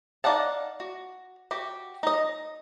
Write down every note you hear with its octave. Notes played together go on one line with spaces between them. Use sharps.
D#4 D5 F5 F#5 A5
F#4
F#4 G4
D#4 D#5